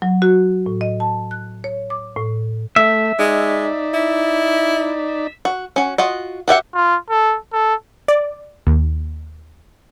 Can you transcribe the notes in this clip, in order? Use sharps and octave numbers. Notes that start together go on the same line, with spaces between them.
F#3
F#4
A2
D#5
A5
F#6
C#5
D6
A2
A3 E5
G#3 D#4 D5
E4
F#4
C#4 F#4
F4 F#4 D#5
F#4 G4 E5 F#5
F4
A4
A4
D5
D#2